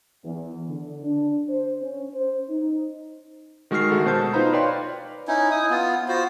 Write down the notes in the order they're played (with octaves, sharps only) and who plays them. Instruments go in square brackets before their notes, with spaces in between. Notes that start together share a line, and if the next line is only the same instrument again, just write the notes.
[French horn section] E2
D3
D4
C5
C#4
C5
D#4
[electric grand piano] D#3 G#3 F#4 A#4 F6 C7
D2 F#4 A4
B2 C5 A5 G6
D#4 F4 B4 C5 A#5 B5
B4 C#5 D5 F5 G5 C6
[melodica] C#4 D#4 E4
E4 D#6
B3 F4
F4 F#4 C5